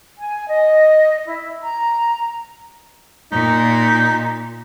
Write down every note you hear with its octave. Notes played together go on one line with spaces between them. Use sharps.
G#5
D#5
E4
A#5
A#2 D#4